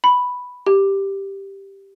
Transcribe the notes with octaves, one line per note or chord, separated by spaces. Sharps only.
B5
G4